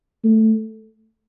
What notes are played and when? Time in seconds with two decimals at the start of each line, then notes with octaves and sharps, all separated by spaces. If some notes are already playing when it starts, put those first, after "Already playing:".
0.24 A3